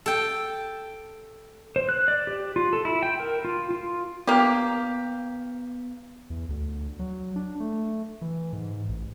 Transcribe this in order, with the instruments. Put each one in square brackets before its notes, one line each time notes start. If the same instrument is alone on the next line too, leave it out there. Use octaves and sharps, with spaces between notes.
[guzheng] A4 G5
[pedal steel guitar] C5
F#6
D5
G4
F4
A4
E4
G5
A#4
F4
F4
[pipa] A#3 G4 [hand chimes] B3
[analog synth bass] E2
D2
F#3
D4
A3
E3
G#2
A1